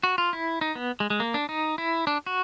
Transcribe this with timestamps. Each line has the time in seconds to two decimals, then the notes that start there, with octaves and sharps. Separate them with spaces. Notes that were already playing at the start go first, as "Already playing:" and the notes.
0.03 F#4
0.18 F4
0.33 E4
0.61 D#4
0.75 B3
1.00 G#3
1.10 G#3
1.20 A#3
1.34 D4
1.49 D#4
1.78 E4
2.07 D4
2.26 F#4